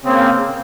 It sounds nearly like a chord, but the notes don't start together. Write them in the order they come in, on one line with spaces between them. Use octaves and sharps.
C#3 C4 A#3